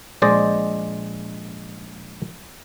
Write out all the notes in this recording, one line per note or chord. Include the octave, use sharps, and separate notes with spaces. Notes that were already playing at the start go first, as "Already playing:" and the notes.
A#1 G#3 C5 D5 D#5